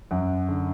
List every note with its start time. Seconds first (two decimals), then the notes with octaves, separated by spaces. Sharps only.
0.11 F#2 F#5
0.48 D3